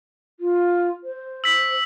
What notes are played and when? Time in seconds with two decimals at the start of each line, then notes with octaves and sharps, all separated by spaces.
0.40 F4
1.04 C5
1.44 E6 B6